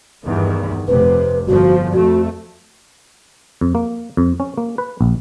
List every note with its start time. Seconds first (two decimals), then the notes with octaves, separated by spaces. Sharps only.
0.24 E2 G2 D#3
0.88 F1 C3 B4
1.47 G1 F3 F#4
1.93 F2 A3 F#4
3.61 F2
3.75 A#3
4.17 F2
4.40 C#4
4.58 A#3
4.78 B4
5.01 A#1